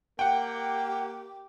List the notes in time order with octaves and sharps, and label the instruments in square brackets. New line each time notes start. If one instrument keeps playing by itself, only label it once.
[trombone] A#3 [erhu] G4 [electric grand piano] F#5 G5